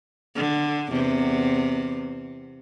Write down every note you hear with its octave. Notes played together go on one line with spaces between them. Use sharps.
D3
E2 C3